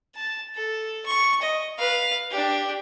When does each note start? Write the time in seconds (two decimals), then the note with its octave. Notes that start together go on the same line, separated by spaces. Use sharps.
0.16 A5
0.55 A4
1.05 C#6
1.41 D#5
1.78 B4 F5
2.31 D4 G4